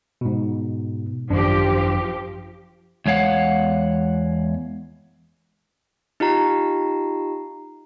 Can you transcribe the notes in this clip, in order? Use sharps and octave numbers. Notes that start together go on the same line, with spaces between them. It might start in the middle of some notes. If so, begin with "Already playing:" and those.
G#2 B2
G#1 F#2 F3 D4 G4
E2 G#3 C#5 F5 F#5
D#4 F4 G4 A#5 C7